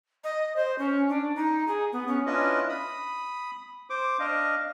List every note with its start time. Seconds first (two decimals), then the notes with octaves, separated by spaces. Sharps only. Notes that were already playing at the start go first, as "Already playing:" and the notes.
0.24 D#5
0.56 C5
0.79 C#4
1.09 D4
1.36 D#4
1.68 G#4
1.92 B3
2.08 C#4
2.26 C#4 D4 E4 F4 B4 D#5
2.69 B5 D#6
3.90 C5 D6
4.19 D4 D#5 F5